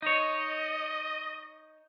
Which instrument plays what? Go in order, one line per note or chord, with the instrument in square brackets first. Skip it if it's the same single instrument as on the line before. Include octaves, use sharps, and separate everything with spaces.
[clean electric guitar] D#4 C#5 [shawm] D#5